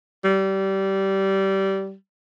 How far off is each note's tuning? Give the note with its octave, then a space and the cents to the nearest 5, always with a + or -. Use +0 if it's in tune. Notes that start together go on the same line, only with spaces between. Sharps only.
G3 -20